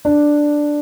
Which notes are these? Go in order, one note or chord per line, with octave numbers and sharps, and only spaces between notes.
D4